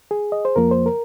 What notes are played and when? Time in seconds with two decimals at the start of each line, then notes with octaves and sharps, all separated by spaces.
0.11 G#4
0.32 D#5
0.45 C5
0.56 F2 F3 A#3 A#4
0.71 C5
0.86 A#4